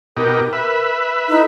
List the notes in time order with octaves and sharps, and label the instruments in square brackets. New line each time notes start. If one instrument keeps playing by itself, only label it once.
[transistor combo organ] B2 D#4 G4 [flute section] A#4
[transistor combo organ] B4 E5
[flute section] D#4 E4 A4